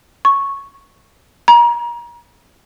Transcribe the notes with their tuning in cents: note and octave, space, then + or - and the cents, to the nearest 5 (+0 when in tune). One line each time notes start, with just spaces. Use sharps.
C#6 -5
A#5 +30